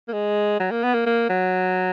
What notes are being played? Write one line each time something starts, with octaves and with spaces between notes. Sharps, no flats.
A#3
G#3
F#3
A#3
B3
A#3
A#3
F#3